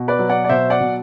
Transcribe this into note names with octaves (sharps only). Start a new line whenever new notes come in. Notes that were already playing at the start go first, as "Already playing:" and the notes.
Already playing: B2
B4 D5
F#3
D5 F#5
D5
B2 C5 E5
D5 F#5
B2